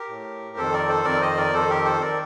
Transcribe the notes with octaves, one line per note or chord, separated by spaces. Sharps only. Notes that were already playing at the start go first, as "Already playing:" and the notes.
Already playing: G4 A#4
A2
F2 D#3 A4 C5
A#4 D5
A4 C5
F2 D#3 A#4 D5
C5 D#5
A#4 D5
F2 D#3 A4 C5
G4 A#4
A4 C5
D#3 A#4 D5